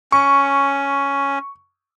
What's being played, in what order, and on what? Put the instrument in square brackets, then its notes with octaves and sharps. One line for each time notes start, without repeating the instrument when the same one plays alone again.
[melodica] C#4 [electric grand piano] C#6